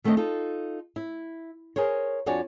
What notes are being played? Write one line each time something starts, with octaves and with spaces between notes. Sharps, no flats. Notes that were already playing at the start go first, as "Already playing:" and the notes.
D#3 A3 B3 C4 D4 D#5
D#4 F4 A4
E4
G#4 A#4 C5 C#5
F2 D4 F#4 C#5 D5 G#5